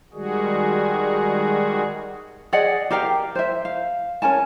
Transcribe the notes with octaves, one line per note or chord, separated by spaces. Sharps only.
D#3 G3 G#3 F#4 G#4
G#4 D5 D#5 F#5
G4 A#4 F5 G5
C5 E5
F5
C#4 A#4 G#5 A5